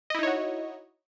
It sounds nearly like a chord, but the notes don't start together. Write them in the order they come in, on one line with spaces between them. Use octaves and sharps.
D#5 E4 D#4 C#5 F#4